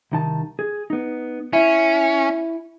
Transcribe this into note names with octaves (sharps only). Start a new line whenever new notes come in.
C2 D#3 A5
G#4
B3 D#4
C#4 E4